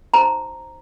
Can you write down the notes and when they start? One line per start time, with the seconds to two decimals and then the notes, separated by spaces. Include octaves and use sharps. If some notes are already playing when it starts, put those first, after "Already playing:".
0.14 D#4 F#4 C5 A#5